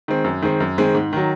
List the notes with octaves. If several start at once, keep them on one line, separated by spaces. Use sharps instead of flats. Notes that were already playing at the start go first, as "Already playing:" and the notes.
D#3 G#3 C4
F#2
D#3 G#3 C4
F#2
D#3 G#3 C4
G#2
D#3 F#3